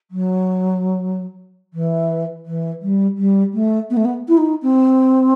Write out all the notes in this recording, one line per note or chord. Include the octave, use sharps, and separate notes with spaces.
F#3
E3
E3
G3
G3
A3
B3
A3
B3
E4
D#4
C4